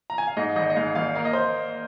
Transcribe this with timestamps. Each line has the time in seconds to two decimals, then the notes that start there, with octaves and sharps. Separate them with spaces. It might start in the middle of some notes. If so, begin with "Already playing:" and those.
0.10 A#5
0.18 G#5
0.27 F5
0.37 G#2 D#5
0.56 G#1 D#5
0.70 D#5
0.76 G#2 F5
0.95 G#1 F5
1.15 A#3 F5
1.25 D#5
1.33 C5